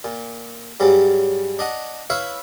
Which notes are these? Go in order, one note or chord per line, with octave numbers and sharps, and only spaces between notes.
A#2
G2 C#3 F#3 G3
D4 D#5 F#5
E4 B4 C#5 E5 F5